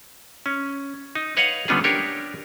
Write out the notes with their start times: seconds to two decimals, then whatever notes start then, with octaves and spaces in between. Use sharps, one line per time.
0.46 C#4
1.15 D#4
1.37 B4 C#5 D#5 F5 F#5
1.68 D3 G3 B3 C#4 F4 G#4
1.84 D4 G4 A#4 C#5